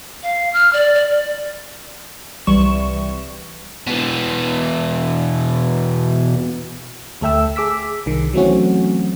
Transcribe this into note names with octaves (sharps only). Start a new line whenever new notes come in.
F5
F6
D5
D5
D5
C2 E3 G3 C#6 E7
B2 E3
D2 A3 A4 E5 G5 E6
G#4 D6 E6 B6
C2 D#3
E3 F#3 A3 C4 C#4 F#4